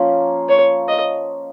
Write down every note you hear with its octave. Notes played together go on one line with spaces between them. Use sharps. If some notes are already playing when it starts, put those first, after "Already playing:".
Already playing: F3 A#3 C#4
C#5
D#5